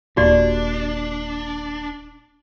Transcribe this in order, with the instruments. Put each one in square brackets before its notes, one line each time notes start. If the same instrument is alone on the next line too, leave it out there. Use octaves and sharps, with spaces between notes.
[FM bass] D#1 [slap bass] A#2 [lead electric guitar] D4 [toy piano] F#4 G4 D5